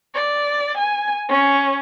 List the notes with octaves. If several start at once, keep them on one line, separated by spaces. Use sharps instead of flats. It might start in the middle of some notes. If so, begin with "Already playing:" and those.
D5
G#5
C#4